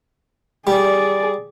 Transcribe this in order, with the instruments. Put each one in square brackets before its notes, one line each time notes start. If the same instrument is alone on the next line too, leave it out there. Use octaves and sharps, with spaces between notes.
[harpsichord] G3 [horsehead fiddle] G#4 D5